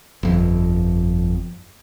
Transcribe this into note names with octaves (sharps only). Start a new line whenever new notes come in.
G1 F2